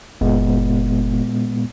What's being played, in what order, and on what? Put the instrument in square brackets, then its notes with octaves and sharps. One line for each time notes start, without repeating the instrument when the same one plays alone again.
[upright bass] F#1 [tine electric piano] A#2 G#3 B3